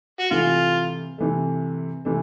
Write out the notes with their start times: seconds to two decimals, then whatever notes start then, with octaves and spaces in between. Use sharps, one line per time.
0.19 F#4
0.31 C3 E3 A3 F4
1.18 C3 E3 A3
2.05 C3 E3 A3